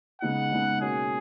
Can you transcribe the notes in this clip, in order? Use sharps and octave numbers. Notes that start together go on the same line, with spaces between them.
C#3 G#3 B3 D#4 F#5
C#3 G#3 B3 D#4
B2 A#3 C#4 G#4